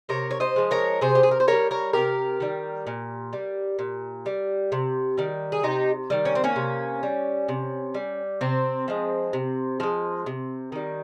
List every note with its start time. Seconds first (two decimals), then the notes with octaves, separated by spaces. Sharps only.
0.09 C3 A#4 C#5
0.31 C#5
0.40 C5 D#5
0.56 F3 G#3
0.71 A#4 C#5
1.01 C3 G#4 C5
1.15 G4
1.23 G#4
1.31 A#4
1.40 C5
1.48 D#3 A#4 C#5
1.52 G3
1.71 A#4 C#5
1.93 C3 G4 A#4
2.40 D#3 G3
2.87 A#2
3.33 G3
3.79 A#2
4.26 G3
4.72 C3
5.18 D#3 G3
5.52 G#4
5.63 C3 D#4 G4
6.10 D#3 G3
6.25 C#4
6.35 C4
6.44 A#3 C#4
6.56 C3
7.03 G3
7.49 C3
7.94 G3
8.41 C3 C4
8.88 F3 G#3
9.33 C3
9.80 F3 G#3
10.26 C3
10.72 D#3 G3